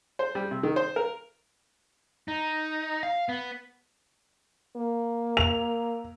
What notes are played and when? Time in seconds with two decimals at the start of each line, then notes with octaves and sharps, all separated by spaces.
0.19 C5
0.35 G3
0.51 C3
0.63 D#3
0.76 C5
0.96 A#4
2.28 D#4
3.03 F5
3.29 B3
4.77 A#3
5.37 F7